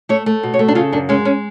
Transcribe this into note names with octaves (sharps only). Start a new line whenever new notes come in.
A3 C#5
A3
B2
C#5
A3
D4
C#3 F4
F#2 D4
G#3 C#4
C#4